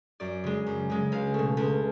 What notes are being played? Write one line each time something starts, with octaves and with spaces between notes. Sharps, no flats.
F#2 D5
C#3 G#3
F#2
C#3 G#3
C#2 F5
B2 A3
C#2